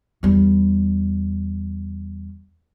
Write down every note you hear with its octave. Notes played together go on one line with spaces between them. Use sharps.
E2 G3